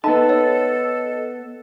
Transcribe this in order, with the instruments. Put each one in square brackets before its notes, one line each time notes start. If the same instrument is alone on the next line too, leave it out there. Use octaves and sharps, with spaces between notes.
[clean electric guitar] B3 A5 [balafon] D#4 [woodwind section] A4 [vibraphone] D#5
[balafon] C#5